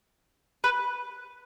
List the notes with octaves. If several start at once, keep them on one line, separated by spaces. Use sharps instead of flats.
B4